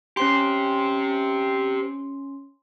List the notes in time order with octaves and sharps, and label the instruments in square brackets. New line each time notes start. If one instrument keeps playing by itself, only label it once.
[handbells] C#4 C6 [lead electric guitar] G4 C5